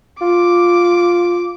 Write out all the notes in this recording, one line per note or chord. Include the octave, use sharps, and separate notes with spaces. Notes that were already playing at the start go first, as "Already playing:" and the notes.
F4 D6